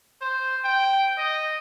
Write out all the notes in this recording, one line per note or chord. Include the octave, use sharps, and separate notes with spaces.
C5
G5
D#5